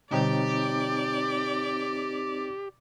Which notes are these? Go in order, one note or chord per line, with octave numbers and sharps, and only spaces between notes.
B2 D3 G3 C4 D#4 G4 C#5 D5